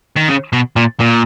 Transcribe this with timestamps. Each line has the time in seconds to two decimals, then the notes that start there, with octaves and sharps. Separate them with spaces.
0.17 D#3
0.29 C#3
0.53 B2
0.76 A#2
1.00 A#2